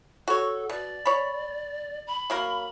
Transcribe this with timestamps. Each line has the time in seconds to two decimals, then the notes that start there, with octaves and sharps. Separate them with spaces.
0.28 F#4 A4 C#5
0.70 B2 D5
1.06 C#5 B5
2.07 B5
2.30 F#3 A#3 A#4